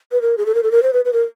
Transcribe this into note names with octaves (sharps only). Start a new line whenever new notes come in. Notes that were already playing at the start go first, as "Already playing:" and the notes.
B4
A#4
G#4
A4
A#4
A4
A#4
C5
B4
B4
A#4